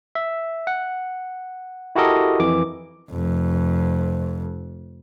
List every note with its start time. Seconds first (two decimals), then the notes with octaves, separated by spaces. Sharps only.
0.15 E5
0.67 F#5
1.95 E4 F#4 G4 A4 A#4 D#5
2.40 F2 E3 D6
3.11 F1 F2